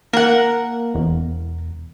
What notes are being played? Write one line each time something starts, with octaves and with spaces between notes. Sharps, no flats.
A#3 A#4 F#5
E1